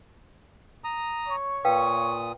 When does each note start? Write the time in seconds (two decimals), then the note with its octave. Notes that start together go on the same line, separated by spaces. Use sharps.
0.84 A#5 D#6
1.28 C#5 C#6
1.65 A#2 B4 F5 G5 D#6